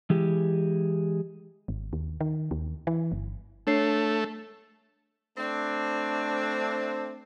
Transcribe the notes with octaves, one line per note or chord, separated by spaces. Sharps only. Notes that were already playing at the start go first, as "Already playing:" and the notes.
E3 G#3 G4
G#1
D#2
D#3
D#2
E3
G1
A3 D4 C#5 C7
A3 C4 D4